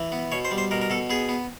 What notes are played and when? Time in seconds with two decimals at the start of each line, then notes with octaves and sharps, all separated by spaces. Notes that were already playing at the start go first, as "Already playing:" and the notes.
Already playing: E3
0.12 B3
0.32 B2 C#5
0.45 C5
0.51 G3
0.58 C5
0.71 B2 A#4
0.82 A#4
0.90 B2 A4
1.10 B3 G#4
1.29 B3